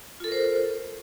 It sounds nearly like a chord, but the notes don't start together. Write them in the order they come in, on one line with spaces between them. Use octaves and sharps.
F4 A4 A#4 C5